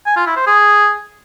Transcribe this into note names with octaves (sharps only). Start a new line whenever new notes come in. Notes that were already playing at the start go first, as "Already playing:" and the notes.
G#5
F4
E4
C5
G#4